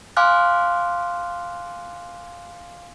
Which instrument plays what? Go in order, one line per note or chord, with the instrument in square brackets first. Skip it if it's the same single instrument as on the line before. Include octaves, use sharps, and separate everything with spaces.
[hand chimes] F5 G#5 C6 D6 F6 F#6